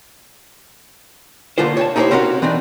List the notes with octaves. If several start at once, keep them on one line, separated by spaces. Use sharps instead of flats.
D3 A3 A#3 F4 C5
C#5 G5 A5
D#4 E4 G4 G#4 C5 C#5
C4 C#4 E4 F#4 A#4 F5
E3 C4 D4 D#4